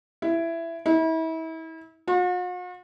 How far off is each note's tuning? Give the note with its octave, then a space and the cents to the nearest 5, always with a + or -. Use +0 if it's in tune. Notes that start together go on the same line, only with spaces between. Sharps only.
E4 +15
E4 -35
F#4 -45